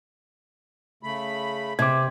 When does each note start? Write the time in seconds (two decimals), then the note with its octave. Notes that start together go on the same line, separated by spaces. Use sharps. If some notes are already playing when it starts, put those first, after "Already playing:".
1.03 C#3 A3 B5
1.79 C3 D6 G#6